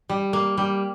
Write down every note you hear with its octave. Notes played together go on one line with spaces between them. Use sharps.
G3
A#3
G3